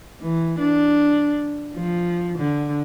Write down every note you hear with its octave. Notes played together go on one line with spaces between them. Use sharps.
E3
D4
F3
D3